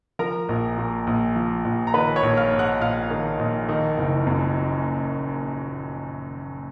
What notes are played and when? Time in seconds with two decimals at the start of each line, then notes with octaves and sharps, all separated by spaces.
0.19 F3 A#4 A#5
0.49 A#1
0.78 A#2
1.07 A#1
1.36 F3
1.65 A#1
1.87 A#5
1.94 D#3 B4 B5
2.16 C#5 C#6
2.23 A#1
2.37 F5 F6
2.52 G#2
2.59 F#5 F#6
2.81 A#1 F5 F6
3.10 D#3
3.39 A#1
3.69 D#3
3.98 F#1
4.27 F#2